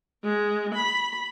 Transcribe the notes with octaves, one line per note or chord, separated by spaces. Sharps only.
G#3
B5